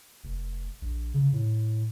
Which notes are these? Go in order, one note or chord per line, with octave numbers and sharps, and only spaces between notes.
F1
A#1
C#3
A2